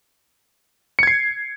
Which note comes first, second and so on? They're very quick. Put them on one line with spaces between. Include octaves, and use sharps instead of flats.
C#7 G#6 C7